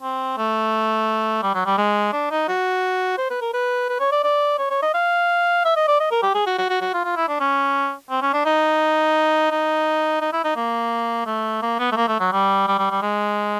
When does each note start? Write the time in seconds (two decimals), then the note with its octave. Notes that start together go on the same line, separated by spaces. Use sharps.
0.02 C4
0.37 A3
1.43 G3
1.55 F#3
1.66 G3
1.78 G#3
2.13 D4
2.31 D#4
2.48 F#4
3.18 C5
3.30 B4
3.42 A#4
3.54 B4
3.89 B4
4.00 C#5
4.12 D5
4.24 D5
4.59 C#5
4.70 C#5
4.82 D#5
4.94 F5
5.65 E5
5.76 D#5
5.88 D5
6.00 D#5
6.11 A#4
6.23 G4
6.35 G#4
6.46 F#4
6.59 F#4
6.70 F#4
6.81 F#4
6.94 F4
7.05 F4
7.16 E4
7.28 D4
7.40 C#4
8.10 C4
8.22 C#4
8.34 D4
8.46 D#4
9.51 D#4
10.21 D#4
10.33 E4
10.44 D#4
10.56 A#3
11.26 A3
11.62 A#3
11.79 B3
11.92 A3
11.96 A#3
12.08 A3
12.20 F#3
12.32 G3
12.67 G3
12.79 G3
12.91 G3
13.02 G#3